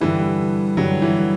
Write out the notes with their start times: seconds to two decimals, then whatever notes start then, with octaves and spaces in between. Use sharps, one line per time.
0.01 G2 D3 E3 G3
0.77 G2 D3 F#3 G3
1.02 E3